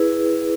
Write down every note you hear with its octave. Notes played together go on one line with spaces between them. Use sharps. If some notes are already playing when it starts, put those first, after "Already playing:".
Already playing: E4 G#4 B4